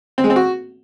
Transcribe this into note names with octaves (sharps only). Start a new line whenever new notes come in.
C4
G#3
C4
F#4